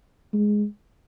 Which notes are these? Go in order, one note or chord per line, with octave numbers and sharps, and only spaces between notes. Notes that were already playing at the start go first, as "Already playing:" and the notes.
G#3